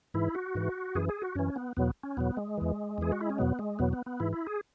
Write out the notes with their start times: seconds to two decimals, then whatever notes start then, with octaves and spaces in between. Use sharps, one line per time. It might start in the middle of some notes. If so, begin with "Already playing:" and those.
0.14 G#2 E3 E4
0.35 F#4
0.55 G#2 E3
0.95 F#2 E3 G#4
1.09 G#4
1.22 F#4
1.35 F#2 E3 C#4
1.56 B3
1.77 E2 B2 F#3 B3
2.03 C#4
2.17 E2 B2 F#3 B3
2.37 G#3
2.58 E2 E3
2.98 E2 E3 G#4
3.12 F#4
3.21 E4
3.30 C#4
3.38 E2 B2 F#3 B3
3.59 G#3
3.79 E2 B2 F#3 B3
3.93 B3
4.06 B3
4.20 G#2 E3 E4
4.33 E4
4.47 G#4